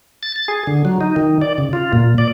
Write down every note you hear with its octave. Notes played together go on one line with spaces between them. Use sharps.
A6
A6
G#4
D3
F#3
D#4
D#3
D5
C#3
F4
A#2
D5